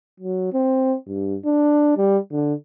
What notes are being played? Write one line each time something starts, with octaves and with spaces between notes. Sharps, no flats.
F#3
C4
G2
D4
G3
D3